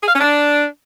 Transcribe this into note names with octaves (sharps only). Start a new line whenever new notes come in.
G#4
F5
C#4
D4